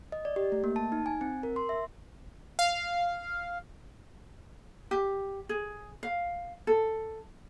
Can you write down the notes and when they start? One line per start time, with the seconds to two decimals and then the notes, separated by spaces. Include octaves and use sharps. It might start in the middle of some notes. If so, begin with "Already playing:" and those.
0.12 D#5
0.25 D5
0.36 G4
0.52 A3
0.64 A#3
0.76 A5
0.92 D#4
1.06 G#5
1.21 C4
1.43 A#4
1.56 C6
1.69 E5
2.59 F5
4.91 G4
5.49 G#4
6.03 F5
6.67 A4